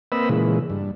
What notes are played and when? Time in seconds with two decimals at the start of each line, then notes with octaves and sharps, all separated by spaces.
0.12 A#3 C4 B4 D#5 B5 E6
0.29 A#2 C#3 E3 G#3
0.70 G2